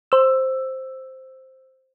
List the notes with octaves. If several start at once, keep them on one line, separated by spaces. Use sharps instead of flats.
C5 E6